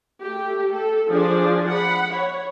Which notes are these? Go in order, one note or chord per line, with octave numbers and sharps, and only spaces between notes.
A3 G4
A4
F3 D4 G#4 D5
F#5 B5
C#5